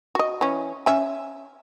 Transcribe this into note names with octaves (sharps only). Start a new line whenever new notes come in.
F#4 D#5
E3 C#4
C#4 E5 G#5